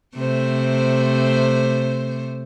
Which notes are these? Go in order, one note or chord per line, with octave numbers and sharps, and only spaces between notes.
C3 A3 C5